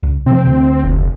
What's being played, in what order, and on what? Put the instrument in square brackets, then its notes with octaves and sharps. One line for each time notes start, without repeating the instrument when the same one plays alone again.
[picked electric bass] C#2
[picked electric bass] C3 F3 [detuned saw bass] C4
[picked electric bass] D2
[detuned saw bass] F1